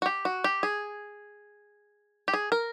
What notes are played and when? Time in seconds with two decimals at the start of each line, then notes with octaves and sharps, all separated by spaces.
0.02 F#4
0.06 G4
0.25 F#4
0.44 G4
0.63 G#4
2.28 G4
2.34 G#4
2.52 A#4